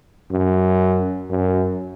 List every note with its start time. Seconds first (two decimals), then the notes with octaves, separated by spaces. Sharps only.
0.32 F#2
1.30 F#2